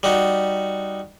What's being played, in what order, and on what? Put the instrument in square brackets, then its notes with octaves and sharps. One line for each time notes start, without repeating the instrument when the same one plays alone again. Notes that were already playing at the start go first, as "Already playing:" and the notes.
[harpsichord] G3 D#4 F#4